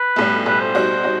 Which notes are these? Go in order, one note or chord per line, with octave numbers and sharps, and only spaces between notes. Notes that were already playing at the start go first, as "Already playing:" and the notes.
Already playing: B4
B1 A2 G3
B1 A2 G3 B4
C5
B2 G3 D#4 F#4
G3 D#4 F#4